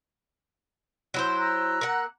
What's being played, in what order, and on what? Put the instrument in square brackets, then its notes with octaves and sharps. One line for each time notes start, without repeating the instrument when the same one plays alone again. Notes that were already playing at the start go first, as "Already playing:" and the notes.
[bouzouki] F#3 E4 C5
[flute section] A#5 E6 F#6
[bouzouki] A#3 F#5